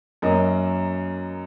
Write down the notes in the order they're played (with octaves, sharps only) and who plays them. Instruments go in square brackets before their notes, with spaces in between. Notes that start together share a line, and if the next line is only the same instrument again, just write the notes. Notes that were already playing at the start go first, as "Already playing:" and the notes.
[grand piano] F#2 F#3 A#3 A#4 D#5